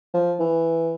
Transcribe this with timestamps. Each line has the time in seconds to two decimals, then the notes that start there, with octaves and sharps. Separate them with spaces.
0.14 F3
0.40 E3